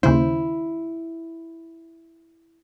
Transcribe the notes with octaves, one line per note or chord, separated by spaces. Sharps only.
D#2 C#3 E4 C5